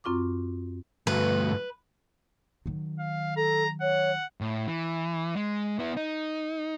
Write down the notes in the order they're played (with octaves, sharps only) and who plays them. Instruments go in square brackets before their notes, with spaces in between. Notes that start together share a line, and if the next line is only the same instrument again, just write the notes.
[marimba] F#2 C4 F4 C#6 D6
[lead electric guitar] D2 G2 [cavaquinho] B4
[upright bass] D#3 F#3
[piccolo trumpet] F5
[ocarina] A4 [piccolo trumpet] A#5
[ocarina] C#5 [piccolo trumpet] F#5
[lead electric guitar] A2
E3
G#3
B3 E4
D#4